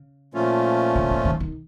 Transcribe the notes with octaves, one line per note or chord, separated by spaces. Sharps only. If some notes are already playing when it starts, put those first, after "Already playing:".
Already playing: C#3
A#2 F3 A3 C#4 F4
D3
C#3
D#3
D#3